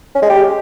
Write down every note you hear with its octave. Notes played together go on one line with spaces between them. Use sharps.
C#4
G#3
G4